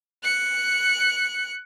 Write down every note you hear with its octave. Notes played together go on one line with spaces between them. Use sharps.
F#6 C#7